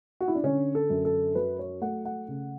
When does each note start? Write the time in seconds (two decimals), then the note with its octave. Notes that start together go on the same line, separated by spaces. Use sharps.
0.21 F#4
0.28 E4
0.35 D4
0.43 D3 C#4
0.75 A4
0.90 F#2
1.05 A4
1.35 F#3 B4
1.59 C#5
1.81 A3 F#5
2.05 F#5
2.28 C#3